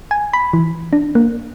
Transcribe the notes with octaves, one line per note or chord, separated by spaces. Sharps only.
G#5
B5
E3
D4
A#3